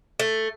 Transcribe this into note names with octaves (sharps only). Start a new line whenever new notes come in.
A3